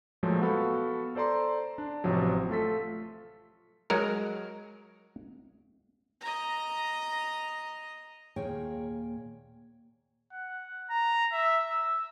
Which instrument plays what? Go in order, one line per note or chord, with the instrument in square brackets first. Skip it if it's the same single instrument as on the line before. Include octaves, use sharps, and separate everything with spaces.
[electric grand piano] A#2 F3 F#3 G#3 A3
B3 F#4 A4 F5 B5
A4 C5 D5 A#5 C6
D4
A1 C3 F3 F#3
A3 F4 A4 B6
[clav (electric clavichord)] F#3 G#3 F#4 A#4
[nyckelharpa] D#5 A#5
[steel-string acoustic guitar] D#2 A#2 A#3 G#4 C#5 G5
[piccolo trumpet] F#5
A#5
E5
E6